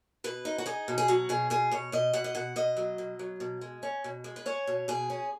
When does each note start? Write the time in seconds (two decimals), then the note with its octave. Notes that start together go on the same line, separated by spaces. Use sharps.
0.24 B2 B4
0.45 D#4
0.58 F#4
0.66 D#4 G#4
0.88 B2
0.98 G#4
1.08 F#3 F#4
1.29 B2 G#4
1.50 B2 G#4
1.71 B2 C#5
1.92 B2 D#5
2.13 B2 F#5
2.24 D#5
2.35 B2 F#5
2.56 B2 D#5
2.77 F#3
2.98 B2
3.19 F#3
3.40 B2
3.61 G#3
3.83 C#4
4.04 B2
4.24 G#3
4.36 B4
4.46 C#4 C#5
4.67 B2
4.88 B2 G#4
5.10 C#4